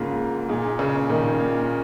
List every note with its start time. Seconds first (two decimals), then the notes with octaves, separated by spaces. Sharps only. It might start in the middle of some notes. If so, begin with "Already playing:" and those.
Already playing: G#2 C#3 A#3 F4
0.49 A#2 A#3 D#4 G#4
0.79 C#3
1.09 A#2 D#3 A#3 D#4 A#4 D#5
1.40 A#2